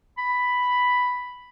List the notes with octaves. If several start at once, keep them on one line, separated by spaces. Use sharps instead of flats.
B5